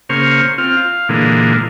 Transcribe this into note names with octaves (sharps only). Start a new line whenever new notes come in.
C#3 A#3 C5 C#6 F6
C4 F4 F6
F5
A#2 D3 E3 G#3 A#3